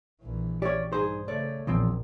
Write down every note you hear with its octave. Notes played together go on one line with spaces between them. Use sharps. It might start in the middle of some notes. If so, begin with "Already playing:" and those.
A#1 E3
C#4 G4 C#5 D5
G2 D#4 G#4 C5
C#3 A3 C#5 D5
A#1 E2 A#2 F3 C4